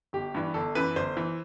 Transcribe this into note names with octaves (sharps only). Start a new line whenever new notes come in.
G1 G4
G2 E3
G1 A4
F#2 E3 B4
G1 C5
E3